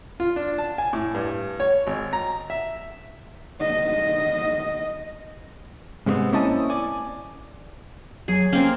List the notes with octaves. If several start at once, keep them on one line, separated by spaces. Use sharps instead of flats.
F4
D4
A5
G#5
A2
G2
C#5
G#1
A#5
E5
D#5
G#2 C3 G#3 A3 B3 C4
A#3 C4 C#4 E4 D#5 A5
D5 G#5
F#3 G#4 G#5
A#3 C4 C#4